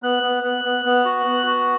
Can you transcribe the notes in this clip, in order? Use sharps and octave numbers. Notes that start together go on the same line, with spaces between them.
B3 F#6
B3
B3
B3
B3
F#4
B3
F#4